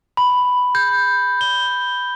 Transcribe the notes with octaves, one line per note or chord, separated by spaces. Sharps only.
B5
G6
G7